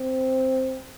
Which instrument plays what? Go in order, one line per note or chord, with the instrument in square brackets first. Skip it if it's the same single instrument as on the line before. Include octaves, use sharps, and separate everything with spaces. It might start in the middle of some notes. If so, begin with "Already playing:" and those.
Already playing: [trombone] C4